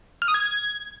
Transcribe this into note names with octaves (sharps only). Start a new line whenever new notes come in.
F6
D#6
G#6